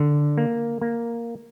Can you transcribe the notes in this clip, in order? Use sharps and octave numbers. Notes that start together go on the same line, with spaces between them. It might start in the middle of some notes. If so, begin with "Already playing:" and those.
Already playing: D3
A#3
A#3